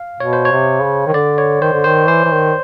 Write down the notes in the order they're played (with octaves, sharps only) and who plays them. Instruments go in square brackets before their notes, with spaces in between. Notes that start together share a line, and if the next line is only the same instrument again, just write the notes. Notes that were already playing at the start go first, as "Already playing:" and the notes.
Already playing: [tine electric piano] F5
[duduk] B2 [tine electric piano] C#5
[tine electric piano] C5
C#5
[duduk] C3
C#3
D#3
[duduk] D3 [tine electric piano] D5
[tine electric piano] C#5
[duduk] D#3 [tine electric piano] C5
[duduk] D3
[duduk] D#3 [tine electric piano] C5
[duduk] E3 [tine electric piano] C5
[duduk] E3
D#3